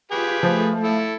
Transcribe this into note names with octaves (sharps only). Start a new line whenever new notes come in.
F4 G4 G#4 B4
F3 A3
E4 A4